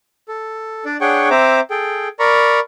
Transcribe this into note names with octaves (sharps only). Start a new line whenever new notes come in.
A4
D4 D5
D4 G#4 C#5 F#5 G5 C#6
C4 C5 E5 A#5 D6
G#4 A4 G5
A#4 D5 A#5 B5 C#6